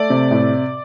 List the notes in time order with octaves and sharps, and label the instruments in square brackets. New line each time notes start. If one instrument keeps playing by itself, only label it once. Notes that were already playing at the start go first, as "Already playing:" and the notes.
Already playing: [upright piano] A3 D5
C3
A2